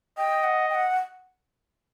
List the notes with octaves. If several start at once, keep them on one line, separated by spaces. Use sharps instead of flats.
D#5 G5
F#5
G5
F#5